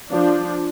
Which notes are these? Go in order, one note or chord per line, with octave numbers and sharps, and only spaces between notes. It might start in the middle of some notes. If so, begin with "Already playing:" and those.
F3 D4